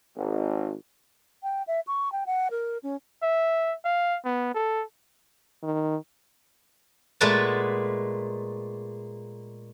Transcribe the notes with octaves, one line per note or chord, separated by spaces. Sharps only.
G#1
G5
E5
C#6
G5
F#5
A#4
C#4
E5
F5
B3
A4
D#3
A#2 G#3 A3 B3 B4 A5